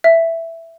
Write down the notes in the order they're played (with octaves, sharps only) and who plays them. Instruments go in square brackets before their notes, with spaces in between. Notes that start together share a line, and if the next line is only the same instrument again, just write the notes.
[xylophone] E5